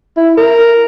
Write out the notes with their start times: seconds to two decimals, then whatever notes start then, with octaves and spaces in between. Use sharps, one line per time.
0.17 E4
0.37 A#4